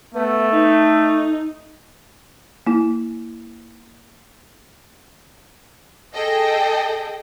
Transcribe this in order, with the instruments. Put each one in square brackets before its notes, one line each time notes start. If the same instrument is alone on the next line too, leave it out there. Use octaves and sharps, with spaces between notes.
[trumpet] A3 [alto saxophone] B3
[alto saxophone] D#4
[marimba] A#3 E4
[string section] G#4 A4 D#5 G5